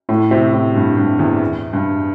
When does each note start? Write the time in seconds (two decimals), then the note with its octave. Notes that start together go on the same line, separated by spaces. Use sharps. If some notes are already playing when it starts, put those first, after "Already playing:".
0.09 A2
0.31 C3
0.53 A2
0.75 G2
0.97 G2
1.19 E2
1.73 G2